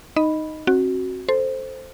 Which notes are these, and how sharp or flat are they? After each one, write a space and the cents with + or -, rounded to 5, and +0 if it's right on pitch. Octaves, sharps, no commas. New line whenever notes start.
D#4 -5 D#5 +0 B5 +0
C4 +40 F#4 +0
A4 +0 C5 +0